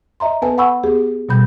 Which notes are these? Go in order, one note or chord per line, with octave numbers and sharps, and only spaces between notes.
D#5 E5 A#5 C6
B3 A4 B4 G#5 A5
F#5 G#5 B5 C#6 E6
B3 G4 G#4
B2 G3 B5 G6